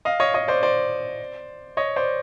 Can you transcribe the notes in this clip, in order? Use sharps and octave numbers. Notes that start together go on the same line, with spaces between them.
D#5 F5
C#5 D#5
C#5 D#5
C5 D5
C5 D5
C#5 D#5
C5 D5